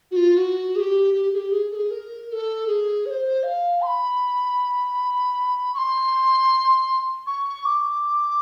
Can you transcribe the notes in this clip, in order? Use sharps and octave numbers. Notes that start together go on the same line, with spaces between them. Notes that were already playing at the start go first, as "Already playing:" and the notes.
F#4
F4
F#4
G#4
G4
G4
G#4
G4
G#4
A4
G#4
A#4
A#4
A4
G#4
C#5
C5
F5
C6
B5
C#6
C6
C#6
D6